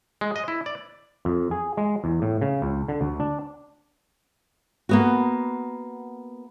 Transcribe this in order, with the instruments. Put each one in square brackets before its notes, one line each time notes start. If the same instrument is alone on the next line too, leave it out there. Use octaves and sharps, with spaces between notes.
[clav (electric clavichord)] G#3
D#5
E4
D5
F2
G#4
G#3
E2
A2
C#3
C#2
D3
D2
D4
[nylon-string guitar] A#3 B3 F#4